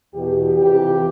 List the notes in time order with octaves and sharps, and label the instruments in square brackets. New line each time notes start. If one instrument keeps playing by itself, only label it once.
[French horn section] E2 B2 G4
F2 C3 E3 G4